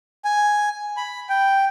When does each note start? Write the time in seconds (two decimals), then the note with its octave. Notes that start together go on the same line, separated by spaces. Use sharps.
0.25 G#5
0.97 B5
1.29 G5